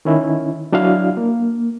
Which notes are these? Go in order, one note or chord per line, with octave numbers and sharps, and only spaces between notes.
D#3 C#4 E4
F#3 D4 E4 F#4 F5
A#3